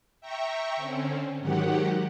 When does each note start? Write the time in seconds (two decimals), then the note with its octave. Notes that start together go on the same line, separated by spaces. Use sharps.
0.21 E5 G5 A#5 C#6
0.76 D3 C4 C#4
1.40 G#2 D#3 F#3 G4 F#5